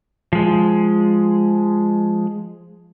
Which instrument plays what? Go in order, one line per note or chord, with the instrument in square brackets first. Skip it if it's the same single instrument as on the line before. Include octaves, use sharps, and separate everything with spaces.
[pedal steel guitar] F3 G#3